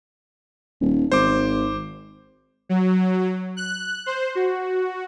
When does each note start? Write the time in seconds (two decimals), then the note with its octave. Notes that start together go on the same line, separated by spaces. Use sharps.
0.81 D#1
1.12 G#1 C5 D6
2.69 F#3
3.57 F#6
4.06 C5
4.35 F#4